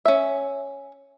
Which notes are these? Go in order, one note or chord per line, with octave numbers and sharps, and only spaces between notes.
C#4 E5